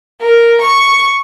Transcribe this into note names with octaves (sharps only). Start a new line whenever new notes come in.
A#4
C#6